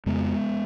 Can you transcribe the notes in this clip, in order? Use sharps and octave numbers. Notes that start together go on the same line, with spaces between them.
F2 C#3 G#3 B3